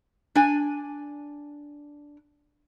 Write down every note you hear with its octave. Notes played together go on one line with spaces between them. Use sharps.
D4 G#5